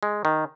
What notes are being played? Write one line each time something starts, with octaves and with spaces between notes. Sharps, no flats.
G#3
D#3